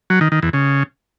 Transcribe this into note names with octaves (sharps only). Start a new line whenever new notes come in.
F#3
D#3
D#3
E2
C#3